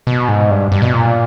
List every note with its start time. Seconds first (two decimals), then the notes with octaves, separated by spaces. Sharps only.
0.07 B2
0.28 G#2
0.50 G2
0.72 G2
0.82 B2
0.93 A#2